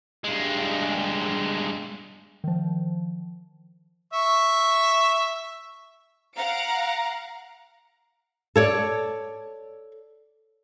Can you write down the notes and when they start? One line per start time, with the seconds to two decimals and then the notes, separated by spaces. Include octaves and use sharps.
0.24 G2 G#3
2.44 D#3 F3
4.13 E5 C#6
6.37 F5 F#5 A#5 D7
8.56 A4 C#5 D5